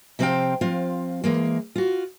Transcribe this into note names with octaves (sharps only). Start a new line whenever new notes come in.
C3 F3 C4 D5 F5 G5
F3 C4 F4
E3 G#3 A#3
F4 F#4